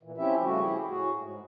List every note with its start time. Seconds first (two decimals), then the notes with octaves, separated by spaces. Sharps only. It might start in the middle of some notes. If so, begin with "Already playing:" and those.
0.03 A#2 E3
0.18 F3 C4 C#4 E4 G4 E5
0.43 C#3 F3 G3 A3 F#4
0.60 E4 G4 G#4
0.87 A2 F#4 G#4
1.16 G#2